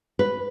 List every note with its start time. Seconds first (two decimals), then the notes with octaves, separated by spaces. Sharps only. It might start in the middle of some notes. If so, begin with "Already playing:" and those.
0.19 B4